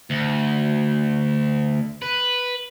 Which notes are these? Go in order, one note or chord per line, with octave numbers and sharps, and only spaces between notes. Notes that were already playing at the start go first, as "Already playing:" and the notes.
D2
B4